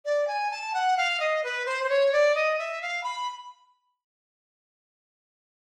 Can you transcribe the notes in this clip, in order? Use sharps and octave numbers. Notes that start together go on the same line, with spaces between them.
D5
G#5
A5
F#5
F5
D#5
B4
C5
C5
C#5
D5
D#5
E5
F5
B5